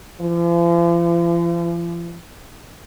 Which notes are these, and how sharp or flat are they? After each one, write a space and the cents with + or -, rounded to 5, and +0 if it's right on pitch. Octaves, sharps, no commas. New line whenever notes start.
F3 -45